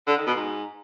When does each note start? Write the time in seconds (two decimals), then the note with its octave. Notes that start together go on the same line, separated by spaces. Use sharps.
0.07 D3
0.17 D#3
0.26 B2
0.36 G#2